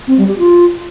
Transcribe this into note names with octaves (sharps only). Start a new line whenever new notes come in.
C4
G3
G4
F4